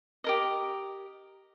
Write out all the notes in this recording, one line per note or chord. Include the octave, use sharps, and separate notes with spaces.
G4 A#4 D#5